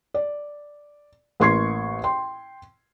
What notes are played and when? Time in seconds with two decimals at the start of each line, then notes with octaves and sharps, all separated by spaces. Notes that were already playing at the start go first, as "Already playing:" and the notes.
0.14 D5
1.40 A1 A#3 C6 C#6 G#6 C7
2.04 G5 C6